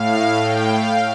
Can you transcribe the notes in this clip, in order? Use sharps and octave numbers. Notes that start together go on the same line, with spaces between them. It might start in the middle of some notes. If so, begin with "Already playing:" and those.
Already playing: A2 F5
G5
F5